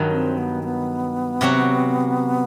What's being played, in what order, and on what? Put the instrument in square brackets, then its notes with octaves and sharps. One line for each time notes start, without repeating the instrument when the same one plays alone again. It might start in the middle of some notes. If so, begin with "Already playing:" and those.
Already playing: [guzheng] G2 D#3 F#3
[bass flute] C4
B3
B3
[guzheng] C3 F#3 C4 F#4